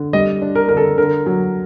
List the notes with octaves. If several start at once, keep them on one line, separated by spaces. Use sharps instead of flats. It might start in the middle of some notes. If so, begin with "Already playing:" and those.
Already playing: D3
G3 D#5
D4
A#4
D3 A#4
A4
D3 A#4
F#3